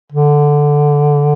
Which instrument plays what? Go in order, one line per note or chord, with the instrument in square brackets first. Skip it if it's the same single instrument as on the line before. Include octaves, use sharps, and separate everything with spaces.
[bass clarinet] D3